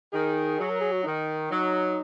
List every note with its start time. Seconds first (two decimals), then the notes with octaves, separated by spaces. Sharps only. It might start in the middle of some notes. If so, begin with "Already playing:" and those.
0.13 D#3 G#4
0.59 F#3
0.69 A#4
0.80 G#4
0.92 F#4
1.04 D#3 D#4
1.50 F#3